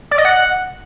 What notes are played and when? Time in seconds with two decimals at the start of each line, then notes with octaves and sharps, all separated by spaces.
0.11 D5
0.18 D#5
0.25 F#5